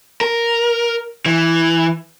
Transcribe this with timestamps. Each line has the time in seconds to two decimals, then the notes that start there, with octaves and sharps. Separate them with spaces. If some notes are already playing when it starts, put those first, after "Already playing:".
0.21 A#4
1.26 E3